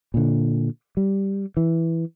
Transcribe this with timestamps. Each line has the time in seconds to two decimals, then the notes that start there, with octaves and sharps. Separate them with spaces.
0.14 A#2 D3
0.97 G3
1.57 E3